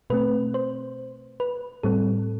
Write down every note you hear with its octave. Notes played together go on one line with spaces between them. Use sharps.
B2 A3 C4 B4
C5
B4
A2 G3 C4 A4